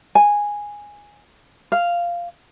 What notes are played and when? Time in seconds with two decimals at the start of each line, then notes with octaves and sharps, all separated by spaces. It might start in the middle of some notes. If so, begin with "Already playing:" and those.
0.15 G#5
1.72 F5